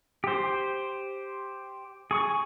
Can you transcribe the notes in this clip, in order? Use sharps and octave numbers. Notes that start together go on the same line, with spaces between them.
G4 C5
G#4 C#6